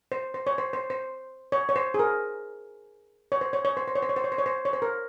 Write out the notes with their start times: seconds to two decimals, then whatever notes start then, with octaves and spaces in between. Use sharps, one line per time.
0.12 C5
0.34 C5
0.47 C#5
0.58 C5
0.73 C5
0.90 C5
1.52 C#5
1.69 C#5
1.76 C5
1.94 G#4
1.99 A#4
3.32 C#5
3.41 C5
3.53 C#5
3.65 C#5
3.77 C5
3.88 C5
3.95 C#5
4.03 C5
4.09 C#5
4.16 C5
4.24 C#5
4.32 C5
4.38 C#5
4.46 C5
4.65 C#5
4.73 C5
4.82 A#4